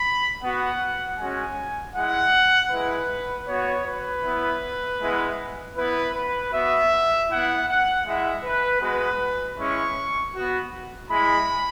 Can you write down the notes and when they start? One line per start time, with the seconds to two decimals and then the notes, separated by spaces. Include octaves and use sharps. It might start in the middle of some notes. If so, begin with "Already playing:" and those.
Already playing: B5
0.43 B3 F#4 F#5
1.19 G#3 C#4 F#4 G#5
1.95 G#3 E4 F#5
2.71 G#3 E4 B4
3.48 B3 F#4 C#5
3.86 B4
4.25 B3 E4
5.00 G#3 B3 E4
5.77 B3 E4 B4
6.14 B4
6.53 B3 F#4 E5
7.30 B3 E4 F#5
7.68 F#5
8.06 G#3 E4 E5
8.44 B4
8.81 G#3 B3 F#4 B4
9.58 G#3 C#4 E4 C#6
10.34 B3 F#4
11.11 G#3 E4 B5